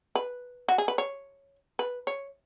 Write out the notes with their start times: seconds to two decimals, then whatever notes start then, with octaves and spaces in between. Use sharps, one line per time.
0.15 B4
0.69 F#4
0.78 G#4
0.88 B4
0.98 C#5
1.79 B4
2.07 C#5